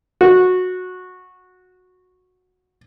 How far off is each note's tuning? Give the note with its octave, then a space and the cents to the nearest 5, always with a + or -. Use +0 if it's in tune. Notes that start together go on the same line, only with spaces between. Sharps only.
F#4 -15